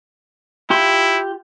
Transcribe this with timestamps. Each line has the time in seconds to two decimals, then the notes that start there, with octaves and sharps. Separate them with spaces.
0.70 E4 F4 G4 C6